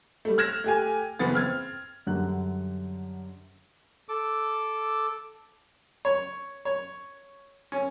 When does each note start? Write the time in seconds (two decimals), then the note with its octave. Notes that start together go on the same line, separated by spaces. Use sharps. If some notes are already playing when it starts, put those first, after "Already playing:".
0.25 G3 A3
0.38 F6 F#6 G#6 A#6 E7 F7
0.64 A3 G4 G#5
1.19 F#1 E3 B3 A6
1.34 C4 F6 G#6
2.07 F#2 D3 G3 F#6
4.09 A4 D6
6.05 C#5
6.65 C#5
7.72 C#4